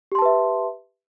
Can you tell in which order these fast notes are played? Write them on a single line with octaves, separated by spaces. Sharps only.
G4 C6 A5 B4 E5